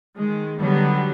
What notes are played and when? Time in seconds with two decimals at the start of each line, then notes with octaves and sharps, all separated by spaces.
0.16 D#3 G#3
0.60 D3 F#3 G3 B3